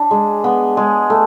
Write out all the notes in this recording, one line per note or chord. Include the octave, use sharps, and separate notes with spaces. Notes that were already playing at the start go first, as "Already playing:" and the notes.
Already playing: D4
G#3
B3
G#3
A3